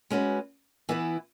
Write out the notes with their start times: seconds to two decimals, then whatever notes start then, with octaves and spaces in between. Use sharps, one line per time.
0.10 G#3 C#4 F#4 B4
0.89 E3 B3 E4 B4